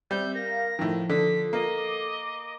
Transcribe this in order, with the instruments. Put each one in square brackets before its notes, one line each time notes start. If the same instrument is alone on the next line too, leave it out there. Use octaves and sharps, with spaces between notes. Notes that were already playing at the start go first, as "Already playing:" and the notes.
[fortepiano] G3 [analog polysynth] C4 E5 [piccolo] G6
[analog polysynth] A#4 F5 [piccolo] A#6
[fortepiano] A2 D#3 [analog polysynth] F3
[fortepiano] D3 [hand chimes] A4 [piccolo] B6
[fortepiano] A#3 [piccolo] D#5
[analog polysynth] D6